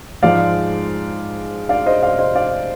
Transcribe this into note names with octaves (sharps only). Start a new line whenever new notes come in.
G#2 F3 G#3 D5 F5
D5 F5
C5 D#5
D5 F5
C5 D#5
D5 F5